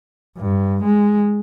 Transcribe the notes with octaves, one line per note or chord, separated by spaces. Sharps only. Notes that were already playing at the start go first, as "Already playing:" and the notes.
G2
G#3